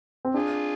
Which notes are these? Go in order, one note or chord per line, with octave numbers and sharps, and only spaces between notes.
C4
D4 F4 G#4